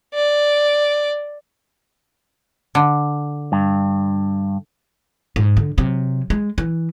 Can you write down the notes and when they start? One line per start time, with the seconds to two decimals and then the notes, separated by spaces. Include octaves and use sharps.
0.14 D5
2.75 D3
3.52 G2
5.36 G#2
5.57 D3
5.78 C3 F#3
6.30 G#3
6.58 E3